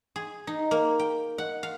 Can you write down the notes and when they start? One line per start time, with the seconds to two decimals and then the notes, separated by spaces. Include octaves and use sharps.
0.16 G#4
0.47 D#4
0.71 A#3
0.99 G5
1.38 F#5
1.63 F5